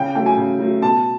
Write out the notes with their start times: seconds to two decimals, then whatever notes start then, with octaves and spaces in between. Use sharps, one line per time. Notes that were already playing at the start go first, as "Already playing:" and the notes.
Already playing: C#3 G5
0.15 F#3 A3 G5
0.26 G#5
0.37 C#3
0.59 F#3 A3
0.82 B2 A5